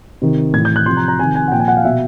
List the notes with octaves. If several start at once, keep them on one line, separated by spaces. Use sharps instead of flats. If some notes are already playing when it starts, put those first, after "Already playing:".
C3 D#3
A2 E3 G#6
G6
F#6
C3 F3 C6
A#5
A#5
C3 D#3 G#5
G#5
F#5
A#2 F3 G5
G#5
F#5
F5
B2 E5